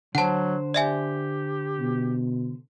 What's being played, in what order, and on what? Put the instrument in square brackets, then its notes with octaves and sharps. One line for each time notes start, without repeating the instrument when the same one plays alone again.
[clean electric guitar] D3 C5 [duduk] F#3 [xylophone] F#5 A5
[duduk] G4 [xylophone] D5 E5 G#5
[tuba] B2